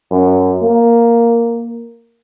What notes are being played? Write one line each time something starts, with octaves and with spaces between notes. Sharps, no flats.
F#2
A#3